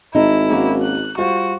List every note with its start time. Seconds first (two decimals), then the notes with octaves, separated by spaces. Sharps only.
0.15 G#1 D#4 E4
0.50 A#3 C#4 F#4
0.83 F#6
1.18 G3 F4 F#4 C5